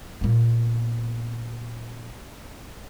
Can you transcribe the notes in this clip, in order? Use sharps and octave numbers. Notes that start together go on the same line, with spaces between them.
A#2 B3